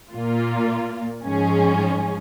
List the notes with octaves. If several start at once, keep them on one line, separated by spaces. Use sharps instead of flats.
A#2 A#3 F4
G#2 F3 C#4 G#4